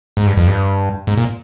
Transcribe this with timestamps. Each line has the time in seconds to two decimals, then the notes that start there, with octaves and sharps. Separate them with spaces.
0.17 G#2
0.26 G2
0.37 F2
0.47 G2
1.07 G#2
1.18 A#2